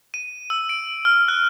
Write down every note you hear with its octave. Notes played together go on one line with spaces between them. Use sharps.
D#7
E6
D7
F6
F#6